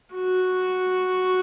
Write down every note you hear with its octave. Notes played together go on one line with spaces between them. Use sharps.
F#4